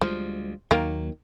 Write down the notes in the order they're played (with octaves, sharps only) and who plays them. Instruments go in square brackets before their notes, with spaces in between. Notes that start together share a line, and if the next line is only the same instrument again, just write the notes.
[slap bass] D2 G3 G#3 [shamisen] F3
[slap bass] D#2 F#3 [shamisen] D#3 A#3